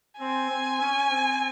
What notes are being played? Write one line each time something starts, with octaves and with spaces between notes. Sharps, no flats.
C4 G#5
C4
C#4
C4